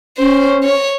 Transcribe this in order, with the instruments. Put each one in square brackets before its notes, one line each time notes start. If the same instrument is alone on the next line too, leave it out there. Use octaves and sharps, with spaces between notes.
[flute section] C#4 [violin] C5
[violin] C#5